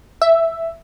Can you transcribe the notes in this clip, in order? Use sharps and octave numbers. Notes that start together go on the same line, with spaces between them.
E5